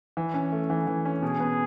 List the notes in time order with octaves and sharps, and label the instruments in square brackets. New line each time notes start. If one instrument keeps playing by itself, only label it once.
[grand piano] E3
C#4
A3
E3
E3
C#4
[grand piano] B2 [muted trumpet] G#4
[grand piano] B3